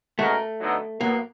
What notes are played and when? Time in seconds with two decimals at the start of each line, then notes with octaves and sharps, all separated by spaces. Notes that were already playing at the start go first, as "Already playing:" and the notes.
0.19 B2 G#3 A3 C#4 F#4 A#4
0.61 D3 F#3 B3 D#4
1.01 A2 F#3 A#3 B3